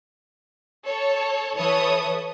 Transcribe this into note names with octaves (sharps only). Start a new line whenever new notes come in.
A4 C#5
E3 A4 B4 C#5 E5 D#6